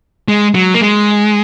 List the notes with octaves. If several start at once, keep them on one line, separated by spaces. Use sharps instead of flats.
G#3
F#3
A#3
G#3